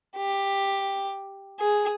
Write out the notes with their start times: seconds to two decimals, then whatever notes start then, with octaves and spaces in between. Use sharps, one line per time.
0.17 G4
1.60 G#4